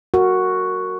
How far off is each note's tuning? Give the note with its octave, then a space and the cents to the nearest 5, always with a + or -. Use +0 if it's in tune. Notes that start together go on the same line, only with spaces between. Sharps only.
F#4 +0 A#4 -20